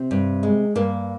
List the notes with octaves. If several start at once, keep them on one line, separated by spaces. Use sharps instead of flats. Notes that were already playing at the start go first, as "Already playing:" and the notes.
Already playing: C3 C4
G2
G#3
G2 A#3